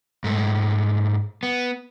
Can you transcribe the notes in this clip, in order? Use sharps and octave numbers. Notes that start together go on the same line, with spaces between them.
G#2 A3
B3